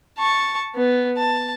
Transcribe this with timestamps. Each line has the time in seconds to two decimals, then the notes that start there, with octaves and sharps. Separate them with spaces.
0.18 A5 C#6
0.75 B3
1.17 A5